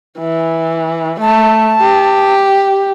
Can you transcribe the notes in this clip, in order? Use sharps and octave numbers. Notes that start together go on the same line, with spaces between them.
E3
A3 A5
G4